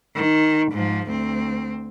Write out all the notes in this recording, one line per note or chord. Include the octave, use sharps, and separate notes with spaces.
D#3
G#2 F3
D2 C4